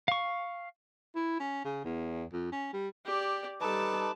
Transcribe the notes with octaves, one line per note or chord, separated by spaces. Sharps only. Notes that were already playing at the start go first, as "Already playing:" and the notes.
F5 C#6
E4
C#4
C#3
E2
F2
C#4
G3
G4 D5
G3 D#4 A4 B4 A5 D6